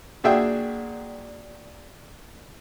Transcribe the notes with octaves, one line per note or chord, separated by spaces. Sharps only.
A#2 D4 F#4 G#4 E5 G5